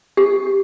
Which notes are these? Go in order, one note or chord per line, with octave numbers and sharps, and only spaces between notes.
G4